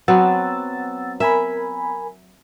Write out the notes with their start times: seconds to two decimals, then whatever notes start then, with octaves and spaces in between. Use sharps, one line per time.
0.08 F#3 B3 C4 F#5 E6 A6
1.20 A#4 E5 G#5 B5